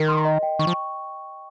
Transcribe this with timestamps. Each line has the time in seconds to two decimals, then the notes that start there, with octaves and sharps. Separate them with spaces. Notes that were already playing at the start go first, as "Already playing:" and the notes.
Already playing: D#3 A#4
0.08 C6
0.25 D#5
0.43 G5
0.59 D#3 C#6
0.67 F3